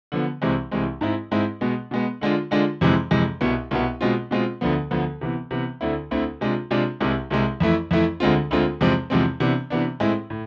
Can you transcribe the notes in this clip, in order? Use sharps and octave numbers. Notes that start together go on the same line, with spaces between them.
D3 F3 B3
C2 C3 E3 G#3 C4
C2 C3 E3 G#3 C4
G#2 G#3 C4 E4
G#2 G#3 C4 E4
B2 G#3 B3
B2 G#3 B3
D3 G#3 D4 F4
D3 G#3 D4 F4
F2 C3 E3 G#3
F2 C3 E3 G#3
C2 B2 B3
C2 B2 B3
B2 G#3 C4 F4
B2 G#3 C4 F4
D2 D3 F3 B3
D2 D3 F3 B3
C3 E3 B3
C3 E3 B3
D2 D3 A3 C4 E4
D2 D3 A3 C4 E4
C3 G#3 D4 F4
C3 G#3 D4 F4
C2 C3 G#3
C2 C3 G#3
F2 E3 A3 E4
F2 E3 A3 E4
D2 D3 G#3 C4 F4
D2 D3 G#3 C4 F4
E2 C3 F3 G#3 C4
E2 C3 F3 G#3 C4
C3 E3 B3 D4
C3 E3 B3 D4
A2 G#3 C4 E4
A2